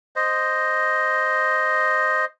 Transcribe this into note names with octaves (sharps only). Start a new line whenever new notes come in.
C5 D#5